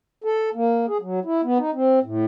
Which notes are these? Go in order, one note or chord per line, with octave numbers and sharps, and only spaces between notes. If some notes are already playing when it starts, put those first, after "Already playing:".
A4
A#3
G#4
F#3
E4
B3
D#4
C4
A2